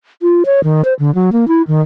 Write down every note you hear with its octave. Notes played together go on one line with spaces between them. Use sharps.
F4
C#5
D#3
C5
D3
F#3
A#3
E4
D#3